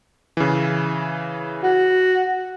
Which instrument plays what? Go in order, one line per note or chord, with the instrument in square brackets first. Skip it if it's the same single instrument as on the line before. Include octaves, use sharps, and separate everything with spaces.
[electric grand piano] C#3 E3
[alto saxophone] F#4